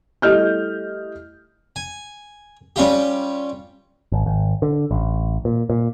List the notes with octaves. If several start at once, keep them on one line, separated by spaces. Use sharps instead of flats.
G3 A3 E4 D#5 F6 G6
G#5
G3 C#4 F4 G4
G#1
G#1
D3
A1
A#2
A#2